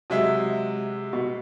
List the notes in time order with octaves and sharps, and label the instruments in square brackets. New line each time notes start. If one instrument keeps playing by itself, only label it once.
[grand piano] C3 G#3 E5 [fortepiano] F#3
[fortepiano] B2